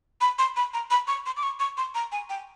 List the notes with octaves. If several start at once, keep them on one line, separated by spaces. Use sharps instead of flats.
B5
C6
B5
A#5
B5
C#6
C6
D6
C#6
C#6
C6
A#5
G#5
G5